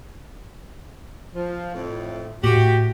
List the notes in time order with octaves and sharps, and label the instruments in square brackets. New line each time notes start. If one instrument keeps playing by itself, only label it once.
[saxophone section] F3
F2 A2
[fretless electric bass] A2 [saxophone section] F#4 G4